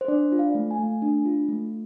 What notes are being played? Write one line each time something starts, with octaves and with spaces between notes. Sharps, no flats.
C5
D4 D5
F4
F5
A3
G#5
A3
D4
F4
A3